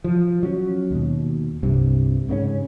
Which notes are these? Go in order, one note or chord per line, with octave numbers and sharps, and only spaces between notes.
F3
F#3 C#4
D#2 B2
C2 G2 C3
G#2 C#3 A#3 C#4